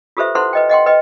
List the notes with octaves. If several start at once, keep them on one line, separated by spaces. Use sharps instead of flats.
F4 G4 A4 B4 C5 E5
E4 A4 B4 C5 F#5 C6
B4 D#5 G5
D#5 F#5 G5 C6
B4 D#5 G5